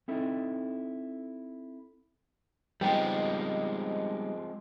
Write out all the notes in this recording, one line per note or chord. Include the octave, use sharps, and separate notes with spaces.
C4 D#4 E4 A4
F3 G3 G#3 B3 C4 D#4 G5